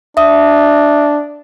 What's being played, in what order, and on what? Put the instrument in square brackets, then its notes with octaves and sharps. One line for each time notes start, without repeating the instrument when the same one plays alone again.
[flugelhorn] D4 [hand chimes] E5 D#6